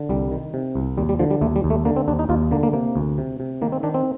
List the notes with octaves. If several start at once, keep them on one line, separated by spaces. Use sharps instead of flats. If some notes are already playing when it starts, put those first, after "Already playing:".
Already playing: D3
C2 G3
D#3
C3
C2
D#2 G3
G3
D3 F3
G3
D#2 A3
G3
D#2
A3
D3 A#3
C4
D#2 D4
D#4
D#2 F4
D3 A#3
A#3
C3 A#3
D2
C3
C3
D#3 A#3
C4
D#3 D4
C4